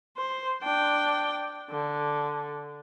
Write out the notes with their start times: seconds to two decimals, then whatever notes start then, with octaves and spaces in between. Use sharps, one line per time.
0.17 C5
0.63 D4 G5
1.70 D3